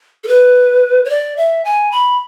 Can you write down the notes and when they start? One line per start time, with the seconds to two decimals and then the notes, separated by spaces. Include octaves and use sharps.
0.24 A4
0.28 B4
1.05 C#5
1.09 D5
1.37 E5
1.65 G#5
1.92 B5